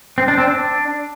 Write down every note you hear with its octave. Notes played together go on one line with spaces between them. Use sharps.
C4
D4
C4
D4